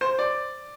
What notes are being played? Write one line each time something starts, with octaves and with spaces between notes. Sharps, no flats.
C5
D5